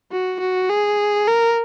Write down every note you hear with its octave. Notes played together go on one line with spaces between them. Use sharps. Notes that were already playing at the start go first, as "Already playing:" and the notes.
F#4
F#4
G#4
A#4